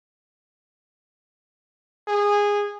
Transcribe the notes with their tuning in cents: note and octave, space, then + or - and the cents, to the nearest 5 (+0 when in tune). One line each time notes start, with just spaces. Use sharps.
G#4 -15